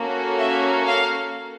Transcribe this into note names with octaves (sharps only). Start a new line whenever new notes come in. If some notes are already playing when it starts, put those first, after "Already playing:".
Already playing: A#3 C#4 F#4 A4
E5
F5